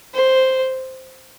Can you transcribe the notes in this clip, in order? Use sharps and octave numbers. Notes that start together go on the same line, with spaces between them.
C5